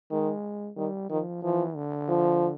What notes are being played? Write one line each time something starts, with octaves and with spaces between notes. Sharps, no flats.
D#3 G#3
D#3 G3
D#3 F3
E3 F3
D3
F3